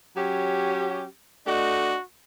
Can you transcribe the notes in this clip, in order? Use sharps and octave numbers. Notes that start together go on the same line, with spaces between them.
F#3 C#4 G4
A3 D4 F#4 D#5